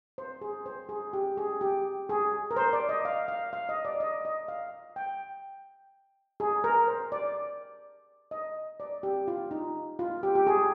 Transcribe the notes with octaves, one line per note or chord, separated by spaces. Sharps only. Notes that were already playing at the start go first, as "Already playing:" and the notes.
C5
G#4
C5
G#4
G4
G#4
G4
G#4
A#4
C5
D5
D#5
F5
F5
F5
D#5
D5
D#5
D#5
F5
G5
G#4
A#4
C5
D5
D#5
D5
G4
F4
D#4
F4
G4
G4
G#4